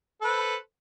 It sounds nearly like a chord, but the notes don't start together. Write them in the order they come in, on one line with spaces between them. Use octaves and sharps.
A4 B4 C5